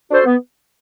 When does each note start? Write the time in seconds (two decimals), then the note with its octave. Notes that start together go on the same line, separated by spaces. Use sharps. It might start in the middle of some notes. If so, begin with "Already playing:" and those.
0.09 D4 F#4 A4 C5
0.25 B3